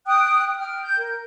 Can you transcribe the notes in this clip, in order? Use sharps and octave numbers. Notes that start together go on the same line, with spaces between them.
G5 D#6 F#6
G5 F6
G6
A#4